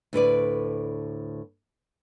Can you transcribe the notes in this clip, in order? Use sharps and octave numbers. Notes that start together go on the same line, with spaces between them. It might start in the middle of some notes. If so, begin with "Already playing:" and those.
D2 A2 B4 D5